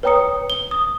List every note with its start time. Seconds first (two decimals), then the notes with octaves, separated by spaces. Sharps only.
0.03 B4 C#5 G5 A#5 D#6 C#7
0.50 G7
0.71 D#6